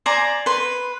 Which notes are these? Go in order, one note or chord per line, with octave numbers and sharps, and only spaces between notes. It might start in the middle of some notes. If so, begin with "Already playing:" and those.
C5 D5 G#5 A#5
B4 C6